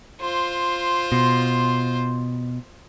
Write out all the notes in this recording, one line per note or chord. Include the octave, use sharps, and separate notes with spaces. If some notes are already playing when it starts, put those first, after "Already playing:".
F4 C5
B2